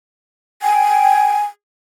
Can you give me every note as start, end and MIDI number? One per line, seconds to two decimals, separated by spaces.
0.62 1.34 79
0.62 1.43 80